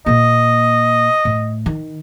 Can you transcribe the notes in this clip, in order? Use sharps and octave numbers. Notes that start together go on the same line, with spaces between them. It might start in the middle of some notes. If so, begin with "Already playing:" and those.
A#2 A#3 D#5
A2
D#3